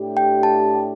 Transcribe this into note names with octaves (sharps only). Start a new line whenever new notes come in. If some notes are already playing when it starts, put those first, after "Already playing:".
Already playing: A2 A3 D4 G4
G5
A5